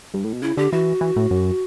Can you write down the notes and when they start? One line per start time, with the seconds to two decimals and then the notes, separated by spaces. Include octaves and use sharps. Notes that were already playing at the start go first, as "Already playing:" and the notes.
0.14 G2
0.24 A2
0.33 B2
0.42 C#3 E4
0.57 D3 G4
0.72 E3 F#4
1.01 E3
1.16 A2
1.31 F#2